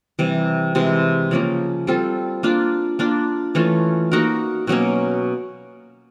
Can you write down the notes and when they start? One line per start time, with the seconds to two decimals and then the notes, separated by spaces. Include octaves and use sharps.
0.19 C3 E3 G3
0.75 C3 E3 G#3
1.31 C#3 F3 A#3 C#4
1.87 G3 C4 F4 A4
2.43 A#3 D4 F4
2.99 A#3 D4 F4
3.55 E3 A3 C#4 F4
4.12 A#3 D#4 F#4 A#4
4.67 B2 F#3 A#3 C#4